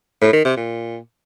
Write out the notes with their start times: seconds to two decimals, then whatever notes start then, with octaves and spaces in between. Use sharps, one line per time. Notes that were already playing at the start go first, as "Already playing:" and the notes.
0.21 A2
0.33 D#3
0.45 C3
0.57 A#2